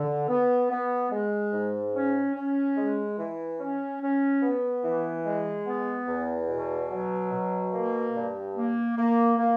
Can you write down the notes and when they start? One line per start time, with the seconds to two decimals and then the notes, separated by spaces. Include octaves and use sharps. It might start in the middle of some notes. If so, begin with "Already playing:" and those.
Already playing: D3
0.28 B3
0.70 B3
1.10 G#3
1.52 G#2
1.93 C#4
2.35 C#4
2.76 G#3
3.18 E3
3.59 C#4
4.01 C#4
4.42 B3
4.83 E3
5.25 G#3
5.65 B3
6.07 E2
6.48 B2
6.90 F#3
7.31 B2
7.72 A#3
8.14 G2
8.55 A#3
8.97 A#3
9.37 A#3